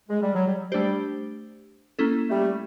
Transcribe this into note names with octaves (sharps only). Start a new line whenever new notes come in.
G#3
G3
F#3
G3
G3 A3 D4 G4 C5
A#3 C#4 E4 A4
G3 A3